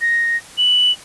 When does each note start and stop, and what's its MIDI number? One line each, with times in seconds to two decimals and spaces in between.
0.01 0.37 94
0.58 0.92 102